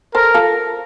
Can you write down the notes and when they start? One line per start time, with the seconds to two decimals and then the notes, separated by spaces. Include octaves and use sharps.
0.15 A4 A#4 C5
0.34 F4 A4